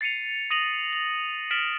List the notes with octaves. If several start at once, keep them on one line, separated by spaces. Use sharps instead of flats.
A6 C7 C#7 D#7 F7
D#6 A#6 D#7 F7 F#7
F7
F6 A6 B6 D7 E7 F#7